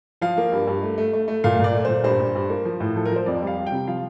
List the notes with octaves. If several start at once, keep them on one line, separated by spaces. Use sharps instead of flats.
F3 F5
A#3
G2
G2
A3
A3
A3
A3
A#2 F5
A#2 D5
A3
A#2 C5
G2 C5
G2
G2
A#3
F3
A2
F3 A4
A#4
F3 C5
F2 D5
G3
F5
G3
G5
C3
F3 F5